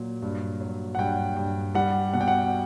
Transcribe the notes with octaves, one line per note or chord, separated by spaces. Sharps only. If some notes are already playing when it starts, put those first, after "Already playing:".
Already playing: A#2 F#3
G2
F#3
F#5
G2 G5
G2
G3 F#5
B2 F#5
G5
F#5